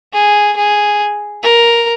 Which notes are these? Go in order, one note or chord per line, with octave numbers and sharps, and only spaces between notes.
G#4
G#4
A#4